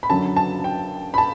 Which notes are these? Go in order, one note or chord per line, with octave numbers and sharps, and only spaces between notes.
B5
F#2 D3 F#3 A5
A5
G5
B5
A5